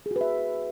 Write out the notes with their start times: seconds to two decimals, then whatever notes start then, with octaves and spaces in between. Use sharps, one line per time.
0.06 G#4
0.11 F#4
0.16 B4
0.21 E5